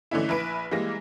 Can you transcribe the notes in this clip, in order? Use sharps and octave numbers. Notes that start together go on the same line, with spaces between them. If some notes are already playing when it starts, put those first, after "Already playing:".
D3 E3 A3 C#4 D#4 E4
A#1 E4 B4 D7
E3 G3 G#3 A#3 A#6